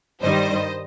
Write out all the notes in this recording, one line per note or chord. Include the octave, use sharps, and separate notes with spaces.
G2 D#3 G3 C5 D#5